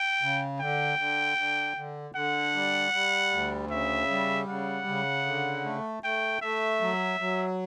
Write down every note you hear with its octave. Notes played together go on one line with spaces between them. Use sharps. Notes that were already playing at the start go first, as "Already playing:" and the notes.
Already playing: G5
C#3
D3 G5
D3
D3
D3
D3 F#5
G3
G3
D2
C#3 E5
G3
C#3 F#5
C#3
D3
A3
A3 G5
A3 E5
F#3
F#3